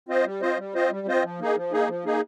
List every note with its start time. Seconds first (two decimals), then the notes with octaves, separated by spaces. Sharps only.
0.09 C4 F4 C5 D#5
0.25 G3
0.42 C4 F4 C5 D#5
0.58 G3
0.74 C4 F4 C5 D#5
0.91 G3
1.07 C4 F4 C5 D#5
1.24 F3
1.40 A#3 D#4 G#4
1.56 F3
1.73 A#3 D#4 G#4
1.88 F3
2.05 A#3 D#4 G#4